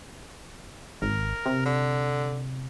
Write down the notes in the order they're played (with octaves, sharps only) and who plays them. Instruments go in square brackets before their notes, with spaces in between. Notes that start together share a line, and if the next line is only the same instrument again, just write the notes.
[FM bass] G#1 [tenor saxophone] A#4
[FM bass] C3
[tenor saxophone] D3